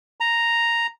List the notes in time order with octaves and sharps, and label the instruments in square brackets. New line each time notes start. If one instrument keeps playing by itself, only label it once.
[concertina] A#5